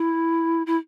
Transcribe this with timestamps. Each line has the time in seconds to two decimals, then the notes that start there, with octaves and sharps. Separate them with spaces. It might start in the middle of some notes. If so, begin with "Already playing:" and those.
Already playing: E4
0.66 E4